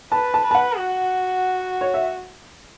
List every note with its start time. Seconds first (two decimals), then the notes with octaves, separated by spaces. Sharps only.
0.12 B4 A5
0.34 A5
0.44 B4
0.51 A5
0.55 F#5
0.77 F#4
1.81 C#5
1.94 E5